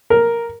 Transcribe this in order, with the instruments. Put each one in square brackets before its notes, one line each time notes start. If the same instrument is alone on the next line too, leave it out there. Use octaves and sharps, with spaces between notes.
[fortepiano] A#4